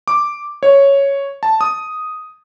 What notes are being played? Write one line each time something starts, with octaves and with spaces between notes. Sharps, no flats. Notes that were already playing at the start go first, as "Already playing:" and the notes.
D6
C#5
A5
D#6